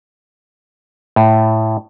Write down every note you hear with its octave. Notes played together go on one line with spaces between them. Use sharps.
A2